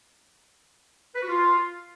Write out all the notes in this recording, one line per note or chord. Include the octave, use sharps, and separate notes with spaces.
B4
F#4
F4